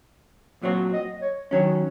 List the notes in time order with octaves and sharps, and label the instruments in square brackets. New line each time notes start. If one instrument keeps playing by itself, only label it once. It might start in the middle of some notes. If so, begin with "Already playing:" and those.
[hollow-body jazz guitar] A#2 F#3 C4 F#4 [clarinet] C#5
[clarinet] D#5
C#5
[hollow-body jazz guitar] D#3 F#3 C#4 [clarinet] C#5